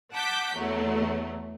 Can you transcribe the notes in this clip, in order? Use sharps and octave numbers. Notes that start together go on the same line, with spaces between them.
F#5 A5 D6 G6 B6
E2 F#3 A3